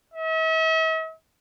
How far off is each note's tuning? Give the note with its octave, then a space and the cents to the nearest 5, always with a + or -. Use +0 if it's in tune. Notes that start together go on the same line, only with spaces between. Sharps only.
E5 -45